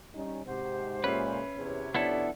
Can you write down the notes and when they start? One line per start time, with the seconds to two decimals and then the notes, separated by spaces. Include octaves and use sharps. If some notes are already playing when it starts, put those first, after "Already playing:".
0.15 G3 C#4 D#4
0.45 G#2 C3 F#4 G4 C5
1.04 A#2 G#3 C#4 B4 E5 C7
1.56 E2 C3 C#5
1.95 F2 B3 D4 E4 A4 D5